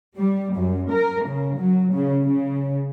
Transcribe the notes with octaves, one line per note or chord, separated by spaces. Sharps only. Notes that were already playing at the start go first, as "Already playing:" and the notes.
G3
F#2
A#4
C#3
F#3
C#3
C#3